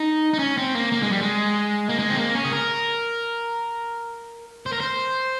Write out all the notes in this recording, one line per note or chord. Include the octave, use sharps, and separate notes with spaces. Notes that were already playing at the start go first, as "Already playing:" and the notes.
Already playing: D#4
D#4
C#4
C4
A#3
A#3
G#3
G3
G#3
A#3
G#3
C4
A#3
C#4
G#4
A#4
C5
A#4
C5